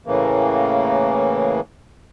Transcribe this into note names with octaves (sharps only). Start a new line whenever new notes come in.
A2 C#3 E3 A#3